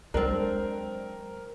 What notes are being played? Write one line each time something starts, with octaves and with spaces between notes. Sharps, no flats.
F#3 G#3 C4 D4 A#4